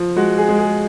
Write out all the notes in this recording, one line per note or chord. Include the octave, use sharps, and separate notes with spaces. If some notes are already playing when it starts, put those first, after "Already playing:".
Already playing: F3
G#3 F#4
G#4
G#3
G#4